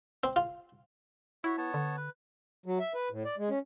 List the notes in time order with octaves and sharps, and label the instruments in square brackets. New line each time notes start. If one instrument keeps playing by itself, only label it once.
[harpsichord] C4
F4
[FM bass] E4 [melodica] F#4 C#5 E5
[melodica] B3 C#5 A5
[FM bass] D3
[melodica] B4
[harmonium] F#3
E5
B4
A2
D5
G#3
C#4